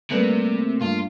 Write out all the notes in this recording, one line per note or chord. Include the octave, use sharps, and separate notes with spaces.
C3 G3 A3 A#3 B4
G2 F4